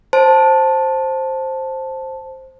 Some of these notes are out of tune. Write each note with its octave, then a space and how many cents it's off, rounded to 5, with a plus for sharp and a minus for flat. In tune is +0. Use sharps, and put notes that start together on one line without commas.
C5 +10 A5 +0